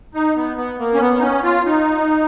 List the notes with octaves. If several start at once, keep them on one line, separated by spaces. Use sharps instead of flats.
D#4
B3
B3
A#3
C#4
B3
D#4
C#4
F4
D#4